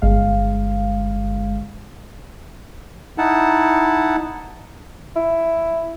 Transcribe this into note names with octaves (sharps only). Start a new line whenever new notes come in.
G1 G#3 F5
D#4 E4 F#5 A5
E4